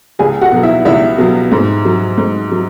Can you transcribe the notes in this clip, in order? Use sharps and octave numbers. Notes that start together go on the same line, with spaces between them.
C#2 G#4 G#5
F#4 F#5
B2 F#3
E4 E5
C#2 E4 E5
B2 F#3
G#2
F#3
G#2
F#3